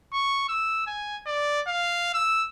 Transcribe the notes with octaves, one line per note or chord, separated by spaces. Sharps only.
C#6
E6
G#5
D5
F5
E6